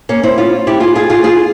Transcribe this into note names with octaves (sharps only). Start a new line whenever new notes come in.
A#3 C#4
C4 E4
C#4 F4
E4 G4
F4 G#4
F4 G#4
F4 G#4
F4 G#4